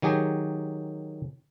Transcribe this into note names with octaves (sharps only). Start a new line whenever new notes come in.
D#3 F#3 G4 G#4